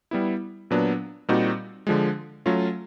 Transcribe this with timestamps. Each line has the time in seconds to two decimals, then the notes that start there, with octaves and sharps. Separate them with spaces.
0.11 G3 B3 E4
0.71 A#2 F#3 B3 D4
1.29 A#2 G3 C4 D#4 F#4
1.87 D3 F3 G#3
2.46 F#3 A3 C#4 F4